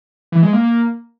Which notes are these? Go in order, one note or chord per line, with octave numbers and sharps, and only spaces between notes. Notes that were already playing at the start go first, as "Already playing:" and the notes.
E3
G#3
A#3
A#3